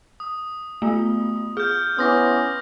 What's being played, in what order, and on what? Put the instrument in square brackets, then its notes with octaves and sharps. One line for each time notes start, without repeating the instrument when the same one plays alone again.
[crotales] D#6
[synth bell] A3 B3 F4
[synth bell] G#4 [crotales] F6 G6
[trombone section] B3 C#4 E4 [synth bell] C6 D6 [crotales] D#6 A#6